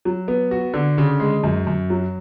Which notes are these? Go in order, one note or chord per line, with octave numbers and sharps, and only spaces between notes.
F#3
B3
F#4
D3
C#3
G#3
F#2
F#2
F#3